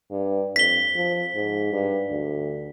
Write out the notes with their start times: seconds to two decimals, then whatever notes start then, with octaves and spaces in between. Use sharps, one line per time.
0.10 G2
0.56 F2 B6 G7
0.95 F3
1.35 G#2
1.72 G2
2.10 D2